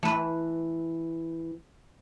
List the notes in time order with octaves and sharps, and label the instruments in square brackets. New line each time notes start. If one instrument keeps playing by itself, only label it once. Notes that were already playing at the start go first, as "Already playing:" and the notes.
[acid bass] E3 [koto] A3 B4